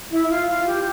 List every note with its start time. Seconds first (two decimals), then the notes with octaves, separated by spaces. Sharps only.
0.11 E4
0.29 F4
0.48 F4
0.66 G4